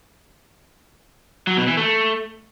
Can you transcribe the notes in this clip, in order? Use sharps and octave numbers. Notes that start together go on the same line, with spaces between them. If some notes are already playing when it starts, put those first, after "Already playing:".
F#3
B2
E3
A3